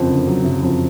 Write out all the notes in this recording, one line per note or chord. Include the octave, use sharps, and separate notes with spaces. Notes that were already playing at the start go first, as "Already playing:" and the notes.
Already playing: F#1 F2
D3
F#3
F#1
F2